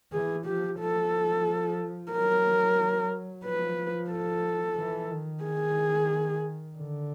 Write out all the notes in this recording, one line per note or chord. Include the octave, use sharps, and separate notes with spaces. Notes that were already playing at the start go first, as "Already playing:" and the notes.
E3 G#4
F3 G4
F3 A4
F#3 A#4
F3 B4
A4
E3
D#3
G#4
D3